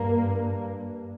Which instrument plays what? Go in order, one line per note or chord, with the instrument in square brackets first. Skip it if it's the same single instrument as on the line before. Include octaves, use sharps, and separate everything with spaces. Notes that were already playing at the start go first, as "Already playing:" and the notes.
Already playing: [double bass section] G2 A#3